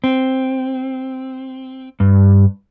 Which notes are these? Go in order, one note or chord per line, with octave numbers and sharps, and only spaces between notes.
C4
G2